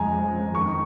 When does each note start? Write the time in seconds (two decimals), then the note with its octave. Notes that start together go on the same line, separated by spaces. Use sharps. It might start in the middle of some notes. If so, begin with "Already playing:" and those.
Already playing: F2 F3 G#3 G#5 A#5
0.54 F2 D#3 C#6